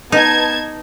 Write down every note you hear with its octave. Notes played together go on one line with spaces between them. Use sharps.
B3 D#4 A5 G#6